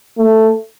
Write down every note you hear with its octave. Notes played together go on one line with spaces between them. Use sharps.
A3